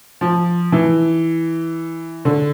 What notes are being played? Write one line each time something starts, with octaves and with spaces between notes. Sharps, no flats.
F3
E3
D3